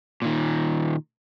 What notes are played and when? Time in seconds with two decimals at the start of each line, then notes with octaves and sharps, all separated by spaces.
0.22 A#2 D#3